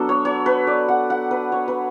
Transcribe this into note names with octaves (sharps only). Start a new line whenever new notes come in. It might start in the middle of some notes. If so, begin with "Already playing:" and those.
Already playing: F#3 B3 D4 A4
C#5
C#5
B4
D5
F#5
F#5
B4
C#5
B4